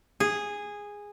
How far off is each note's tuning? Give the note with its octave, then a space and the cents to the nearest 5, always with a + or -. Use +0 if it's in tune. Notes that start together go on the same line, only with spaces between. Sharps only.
G#4 -10